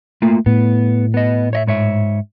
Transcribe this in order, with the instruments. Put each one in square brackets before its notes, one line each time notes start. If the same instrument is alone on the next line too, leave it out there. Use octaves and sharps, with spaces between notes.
[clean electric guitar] A3 A#3 F4
[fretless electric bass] A2 [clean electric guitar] B3
[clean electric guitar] B3 D#5
C#5 D#5 E5
G#2 C#5 E5